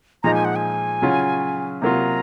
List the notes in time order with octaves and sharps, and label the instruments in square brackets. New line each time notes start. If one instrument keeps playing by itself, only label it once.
[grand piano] A#2 F3 G#3 D#4 [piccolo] A#5
[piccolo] G#5
F#5
G#5
[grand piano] C#3 F#3 C#4 F4
[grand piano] C3 F#3 A#3 F4 [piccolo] A#5